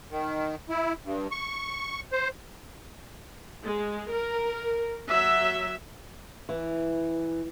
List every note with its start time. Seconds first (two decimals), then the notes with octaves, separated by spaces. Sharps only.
0.11 D#3
0.70 E4
1.04 G2
1.31 C#6
2.12 C5
3.64 G#3
4.11 A#4
5.08 F#3 E5
6.49 E3